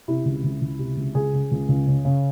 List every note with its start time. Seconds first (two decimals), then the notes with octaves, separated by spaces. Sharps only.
0.08 C3 E4
0.25 C#2
0.44 C#2
0.61 C#2
0.79 C3
0.97 C#2
1.15 C#2 G#4
1.33 C#3
1.51 C#2
1.68 C#2
1.87 C#3
2.05 C#3